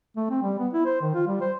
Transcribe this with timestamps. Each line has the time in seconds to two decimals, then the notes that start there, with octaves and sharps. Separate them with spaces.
0.17 A3
0.30 C4
0.42 G3
0.59 B3
0.74 E4
0.86 C5
1.01 D#3
1.14 F4
1.27 G3
1.41 C5